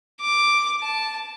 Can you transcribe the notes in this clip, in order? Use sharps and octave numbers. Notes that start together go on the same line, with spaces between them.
D6
A5